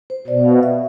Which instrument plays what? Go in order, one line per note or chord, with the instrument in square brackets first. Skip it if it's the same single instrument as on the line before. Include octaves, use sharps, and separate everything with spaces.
[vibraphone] C5
[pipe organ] B2 [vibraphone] D5
[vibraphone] F5
E5